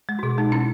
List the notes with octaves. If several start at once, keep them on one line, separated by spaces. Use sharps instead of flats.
G#3
F#4
B2 G#4
G#3 D#4
C#4 E4